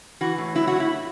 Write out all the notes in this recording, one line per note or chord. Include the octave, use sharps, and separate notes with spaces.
E3 F#4
A2
F#3 E4
A2 F#4
E4